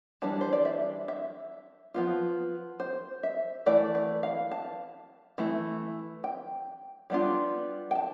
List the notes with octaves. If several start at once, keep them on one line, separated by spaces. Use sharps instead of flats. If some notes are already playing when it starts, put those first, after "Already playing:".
E3 G3 D4 A5
C5
D5
E5
E5
F3 B3 F4
C5
E5
E3 A3 E4 D5
B4
F5
A5
E3 A3 E4
G5
G3 B3 D4 F4
G5
A5